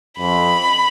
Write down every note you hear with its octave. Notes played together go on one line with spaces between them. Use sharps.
F2 B5